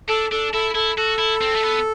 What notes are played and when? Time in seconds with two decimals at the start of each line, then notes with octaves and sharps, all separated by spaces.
0.09 D4 A4
0.32 D4 A4
0.53 E4 A4
0.75 E4 A4
0.97 F#4 A4
1.19 E4
1.41 C4
1.55 A3
1.63 B3